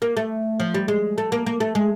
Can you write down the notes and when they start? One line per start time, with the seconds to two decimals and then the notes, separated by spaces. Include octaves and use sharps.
0.02 A#3
0.17 A3
0.60 F3
0.74 G3
0.88 G#3
1.18 A3
1.32 A#3
1.46 A#3
1.60 A3
1.75 G#3